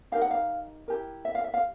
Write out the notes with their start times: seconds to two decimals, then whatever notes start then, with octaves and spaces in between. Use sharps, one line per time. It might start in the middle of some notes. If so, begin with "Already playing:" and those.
0.12 D#4 G4 A#4 F5
0.21 F#5
0.30 F5
0.88 E4 G4 A#4
1.25 E5
1.35 F5
1.44 E5
1.54 F5